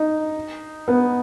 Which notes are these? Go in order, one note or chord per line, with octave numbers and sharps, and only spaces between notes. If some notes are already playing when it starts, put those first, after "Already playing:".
Already playing: D#4
B3